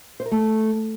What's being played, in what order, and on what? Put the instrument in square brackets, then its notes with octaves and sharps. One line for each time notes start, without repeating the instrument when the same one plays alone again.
[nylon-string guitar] C5
A#4
A3